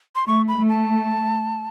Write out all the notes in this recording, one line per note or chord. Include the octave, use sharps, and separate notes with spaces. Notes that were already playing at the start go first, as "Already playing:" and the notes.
C6
A3 C#6
B5
A3
A5